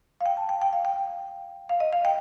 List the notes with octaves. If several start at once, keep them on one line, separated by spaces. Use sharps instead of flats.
F5
G5
A5
G5
G5
F5
G5
F5
D#5
F5
G5